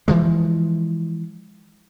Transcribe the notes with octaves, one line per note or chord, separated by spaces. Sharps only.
E3 F3 G#3